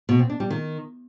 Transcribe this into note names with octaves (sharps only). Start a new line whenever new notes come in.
B2
C4
D4
G3
D#3